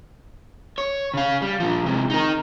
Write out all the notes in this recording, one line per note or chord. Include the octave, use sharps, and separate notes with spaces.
C#5
C#3 F5
G3
A#2 F3
C3 G#3
D#4 A#4